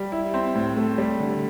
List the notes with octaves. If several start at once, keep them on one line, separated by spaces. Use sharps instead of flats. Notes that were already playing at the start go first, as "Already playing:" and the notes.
Already playing: G3
E4
C4
A2
A3
G3
D3